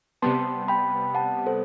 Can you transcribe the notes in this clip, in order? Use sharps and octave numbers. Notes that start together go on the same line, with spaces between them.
C3 G3 B3 A5 C6
G5 B5
F#5 A5
A4 C5